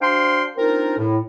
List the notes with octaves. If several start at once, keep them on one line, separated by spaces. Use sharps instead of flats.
D4 F#4 C5 F5 G5 C6
C4 D4 D#4 F4 A#4
A2